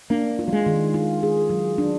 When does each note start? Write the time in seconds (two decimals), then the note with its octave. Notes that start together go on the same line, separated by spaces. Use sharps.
0.10 A#3 D4
0.39 F4
0.48 F#3
0.53 G#3
0.66 D#3
0.94 F4
1.23 G#4
1.50 F#3
1.78 D4